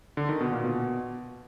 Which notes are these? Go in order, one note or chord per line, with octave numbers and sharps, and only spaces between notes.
D3
D#3
B2
A#2
B2